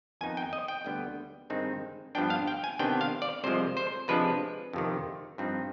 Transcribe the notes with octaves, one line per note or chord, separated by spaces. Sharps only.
F2 D#3 B3 D#4 G#5
G5
D#5
G5
D2 D3 G3 B3
G2 D#3 G#3 C4 D#4
G2 F3 B3 D4 G5
F5
G5
G#5
C3 D#3 B3 D4 G5
F5
D5
C2 C3 F3 G#3 C5
C5
C3 F3 G#3 D4 B4
F2 C3 D#3
G2 F3 C4 D#4